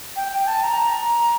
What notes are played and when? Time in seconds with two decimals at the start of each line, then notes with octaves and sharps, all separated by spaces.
0.16 G5
0.32 G5
0.47 A5
0.63 A#5